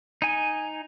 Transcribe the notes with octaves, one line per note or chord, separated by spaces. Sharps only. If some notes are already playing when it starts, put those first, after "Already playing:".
D#4 G#5